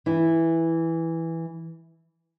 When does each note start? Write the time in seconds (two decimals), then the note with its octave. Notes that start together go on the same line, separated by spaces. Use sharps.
0.06 E3 E4